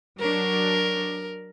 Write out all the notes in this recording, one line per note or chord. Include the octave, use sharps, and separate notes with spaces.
F#3 D4 A#4